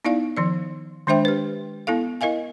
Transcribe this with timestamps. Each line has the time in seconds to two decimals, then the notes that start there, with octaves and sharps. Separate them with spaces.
0.05 B3 D#4 E4 D5 F5
0.37 D#3 F3 D5
1.07 D#3 G#3 D4 C5 E5 G5
1.25 G4 B4
1.87 B3 E4 A4 F5
2.21 E4 A#4 D#5 F5 G#5